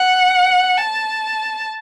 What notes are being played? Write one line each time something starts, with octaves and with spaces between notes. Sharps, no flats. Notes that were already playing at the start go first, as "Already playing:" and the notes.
Already playing: F#5
A5